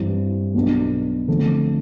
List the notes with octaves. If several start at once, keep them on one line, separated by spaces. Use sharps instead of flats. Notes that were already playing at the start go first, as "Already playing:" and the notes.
Already playing: G2 E3 G3 C4
B1 B2 B3 D4
F2 D3 A3